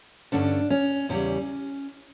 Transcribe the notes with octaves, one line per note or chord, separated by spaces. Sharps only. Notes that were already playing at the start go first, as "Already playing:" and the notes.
G2 D3 A3 C#4 D4
C#4
E2 C#3 E3 G3 C#4